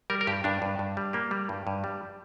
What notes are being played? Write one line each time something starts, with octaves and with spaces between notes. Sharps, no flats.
G3 A#4
A#4
G2 G4
G2 D4
G2
G2
G3
A#3 G4
G3
G2
G2
G3